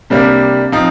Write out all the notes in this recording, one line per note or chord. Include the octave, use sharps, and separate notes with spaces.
C3 G3 A#3 D4
F3 C4 D#4